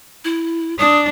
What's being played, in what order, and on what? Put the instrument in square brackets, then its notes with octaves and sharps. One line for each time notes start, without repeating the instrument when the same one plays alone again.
[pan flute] E4
[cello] D4 [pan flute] D#6